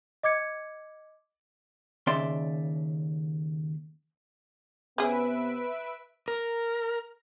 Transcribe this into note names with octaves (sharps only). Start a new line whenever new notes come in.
D#5 D6 G#6 C#7
D#2 C#3 D5 E5 C6
C3 B3 C#4 G#4 B4 E5 D7
A#4